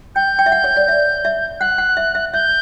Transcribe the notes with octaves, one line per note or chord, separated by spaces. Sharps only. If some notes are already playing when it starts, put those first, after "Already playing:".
G5 G6
G5
E5
F#5
C#5
D5
E5
E5
F#5 F#6
F#5
E5
E5
E5 G6